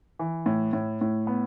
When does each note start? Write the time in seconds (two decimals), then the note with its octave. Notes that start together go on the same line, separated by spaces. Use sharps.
0.19 E3
0.46 A2
0.73 A2
1.01 A2
1.27 B3